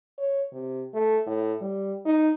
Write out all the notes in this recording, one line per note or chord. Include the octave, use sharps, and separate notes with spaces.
C#5
C3
A3
A2
G3
D#4